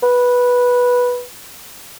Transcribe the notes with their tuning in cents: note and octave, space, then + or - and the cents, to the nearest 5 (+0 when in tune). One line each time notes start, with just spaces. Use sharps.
B4 -10